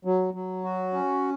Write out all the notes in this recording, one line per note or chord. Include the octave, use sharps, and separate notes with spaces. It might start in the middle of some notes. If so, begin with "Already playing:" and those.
F#3
F#3
F#4
C#4